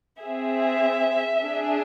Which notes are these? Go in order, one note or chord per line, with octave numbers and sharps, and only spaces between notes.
C4 G#4 E5
D4 G#4